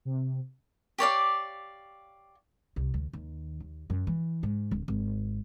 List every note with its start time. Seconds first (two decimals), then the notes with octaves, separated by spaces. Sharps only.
0.05 C3
0.98 G4 C#5 D5 F5
2.76 C2
2.94 D2
3.13 D#2
3.60 D#2
3.90 F#2
4.07 E3
4.43 G#2
4.71 D1
4.88 G#1